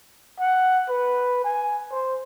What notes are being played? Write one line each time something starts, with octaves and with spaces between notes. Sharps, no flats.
F#5
B4
G#5
C5